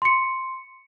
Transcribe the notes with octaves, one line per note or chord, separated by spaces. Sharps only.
C6 C#7